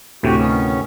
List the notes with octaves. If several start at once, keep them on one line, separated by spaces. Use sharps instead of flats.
D2 A2 C3 F#4 G4
D#3 B3 C#4